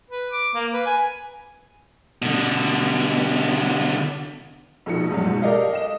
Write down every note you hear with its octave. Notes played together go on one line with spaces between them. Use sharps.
B4
D6
A#3
B4
G#5
B2 D3
A#1 B2 F3 D#4 C#7
A#1 F#2 F#3
G#2 B2 F4
G4 A4 A#4 D5 D#5 F5
D#5 E7